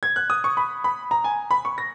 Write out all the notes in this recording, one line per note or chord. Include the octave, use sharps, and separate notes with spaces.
G#6
F#6
D#6
C#6
B5
B5
A#5
G#5
B5
C#6
A#6